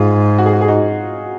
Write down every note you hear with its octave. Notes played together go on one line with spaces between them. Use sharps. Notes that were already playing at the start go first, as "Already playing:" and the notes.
Already playing: G#2 F4 G#4
F#4
G#4
F#4
G#4
D#4 F#4